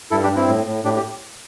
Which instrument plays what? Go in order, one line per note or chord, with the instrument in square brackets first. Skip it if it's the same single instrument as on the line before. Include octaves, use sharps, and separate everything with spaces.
[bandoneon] G2 E4 A4
D4 G4
G2
C4 E4
A2
A2
A2 D4 G4
G4